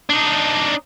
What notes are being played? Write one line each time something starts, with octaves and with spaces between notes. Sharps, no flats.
D4 D#4